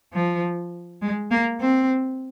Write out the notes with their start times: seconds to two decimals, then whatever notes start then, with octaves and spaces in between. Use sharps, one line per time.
0.13 F3
1.01 G#3
1.31 A#3
1.60 C4